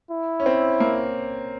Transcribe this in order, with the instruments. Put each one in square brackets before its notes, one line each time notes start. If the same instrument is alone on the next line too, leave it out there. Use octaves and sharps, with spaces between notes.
[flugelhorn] E4
[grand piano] C#4
C4
A#3